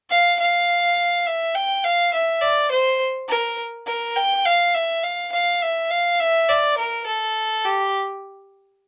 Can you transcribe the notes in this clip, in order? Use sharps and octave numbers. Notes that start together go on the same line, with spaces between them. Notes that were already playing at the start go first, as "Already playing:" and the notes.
F5
F5
E5
G5
F5
E5
D5
C5
A#4
A#4
G5
F5
E5
F5
F5
E5
F5
E5
D5
A#4
A4
G4